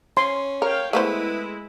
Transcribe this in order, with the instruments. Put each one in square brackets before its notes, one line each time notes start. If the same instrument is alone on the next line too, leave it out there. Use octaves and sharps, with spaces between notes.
[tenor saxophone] C#4 [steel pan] C6
[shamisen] A#4 [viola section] C#5 F5 G5
[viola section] G#3 E4 [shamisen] A3 B3 C5 [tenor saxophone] B4